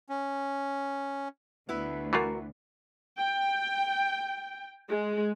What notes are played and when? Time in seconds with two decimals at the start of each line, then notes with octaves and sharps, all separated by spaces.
0.09 C#4
1.69 D2 B3 E4 B4
2.13 E3 A3 F4 F#4 A#4 F#5
3.20 G5
4.91 G#3